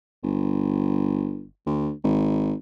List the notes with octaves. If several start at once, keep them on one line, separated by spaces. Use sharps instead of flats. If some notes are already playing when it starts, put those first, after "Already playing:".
G1
D2
G#1